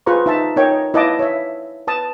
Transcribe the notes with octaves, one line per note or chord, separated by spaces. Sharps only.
F4 G#4 B4 C5 A#5 C#6
D#4 E5 A5
D#4 A#4 C#5 D#5 G5
E4 B4 D#5 F5 A5 D6
C#5 E5
B4 A5 D#6